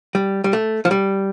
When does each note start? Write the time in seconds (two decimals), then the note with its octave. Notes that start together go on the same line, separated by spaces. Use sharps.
0.15 G3
0.44 G3
0.53 A3
0.85 F3
0.91 G3